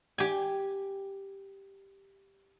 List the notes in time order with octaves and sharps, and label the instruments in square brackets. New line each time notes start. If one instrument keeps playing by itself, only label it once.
[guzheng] G4 G#5